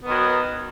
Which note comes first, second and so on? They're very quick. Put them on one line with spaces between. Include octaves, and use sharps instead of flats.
B3 D#3 F#3